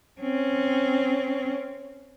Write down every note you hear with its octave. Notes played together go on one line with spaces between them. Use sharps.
C4 C#4